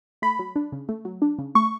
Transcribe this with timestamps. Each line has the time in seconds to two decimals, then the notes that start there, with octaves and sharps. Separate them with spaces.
0.22 A3 B5
0.39 F#3
0.56 D4
0.72 C#3
0.89 A3
1.05 F#3
1.22 D4
1.39 C#3
1.55 A3 C#6